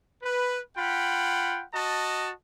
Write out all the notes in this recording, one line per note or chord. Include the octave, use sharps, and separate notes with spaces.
B4
F4 F#5 G5 B5
F#4 D#5 A5